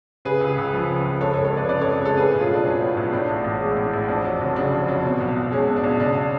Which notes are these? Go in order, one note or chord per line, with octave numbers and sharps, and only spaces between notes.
C#3 G#4 B4
C#2
C#2
F3
C#3
C#2
F2 A4 C#5
A4 C#5
G#3
A4 C#5
F1 B4 D5
C#3 B4 D5
F2 A4 C#5
G#3 A4 C#5
A2 G#4 B4
B1
C#4 F4
B1 D4
F#3 C#4
A2
B1
A2 D4
A1
A1
G#3
A2
A1
F2 D4
F#3
F1
C#3 D4
F2
F#3
B2
B1
B1
G#3 C#4
B2
D4
B1
C#3 D4